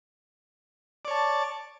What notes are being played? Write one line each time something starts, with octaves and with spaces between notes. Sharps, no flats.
C#5 D5 A5